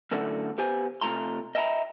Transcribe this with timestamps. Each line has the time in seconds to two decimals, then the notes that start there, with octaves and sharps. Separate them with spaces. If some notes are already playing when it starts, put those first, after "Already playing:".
0.11 F#2 A2 D3 A3 F#4 D5
0.58 B3 G4 C5 G#5
1.01 C3 A3 F4 A#5 C6
1.55 D#5 E5 G5 G#5 A#5 B5